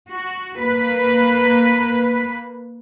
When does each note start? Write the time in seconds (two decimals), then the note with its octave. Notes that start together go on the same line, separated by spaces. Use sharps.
0.10 F#4
0.58 A#3 B4